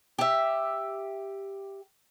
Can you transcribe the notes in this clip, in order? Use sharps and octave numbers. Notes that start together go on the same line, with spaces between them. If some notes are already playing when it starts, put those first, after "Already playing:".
G4 E5